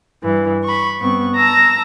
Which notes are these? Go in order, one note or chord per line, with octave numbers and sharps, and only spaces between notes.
G2 E3
B5 C#6
G2 B3 C4 C#6
A5 A#5 E6 A#6